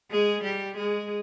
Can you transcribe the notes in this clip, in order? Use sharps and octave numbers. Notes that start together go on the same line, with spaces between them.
G#3 G#4
G3 G4
G#3 G#4